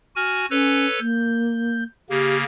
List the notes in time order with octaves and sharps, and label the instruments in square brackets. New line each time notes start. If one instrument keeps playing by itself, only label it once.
[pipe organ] F#4 G#5 F6
[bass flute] C#4 [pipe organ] A4 B4 C#5
[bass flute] A#3 [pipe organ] G6
[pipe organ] C#3 A#3 [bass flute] G4